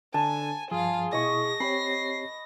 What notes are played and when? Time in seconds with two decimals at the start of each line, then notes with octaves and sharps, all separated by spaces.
0.14 D3 G#5 A5
0.71 G2 F3 F4 G#4 F5
1.13 B2 E4 D#5 C#6 A#6
1.60 C4 G4 C#5 B5 C7